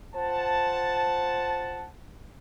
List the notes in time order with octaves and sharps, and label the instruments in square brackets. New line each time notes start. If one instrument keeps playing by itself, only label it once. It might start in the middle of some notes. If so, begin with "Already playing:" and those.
[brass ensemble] F4 C5 F#5 A5